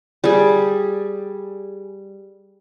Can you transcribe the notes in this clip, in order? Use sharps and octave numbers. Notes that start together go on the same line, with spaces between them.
G3 G#4